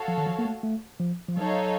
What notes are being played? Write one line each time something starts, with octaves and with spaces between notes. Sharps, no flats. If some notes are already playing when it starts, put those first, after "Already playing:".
Already playing: F#4 A4 C#5 F5 A5
F3
D#3
F3
A#3
A3
A3
F3
F3
F#3 D#4 A4 C#5 F5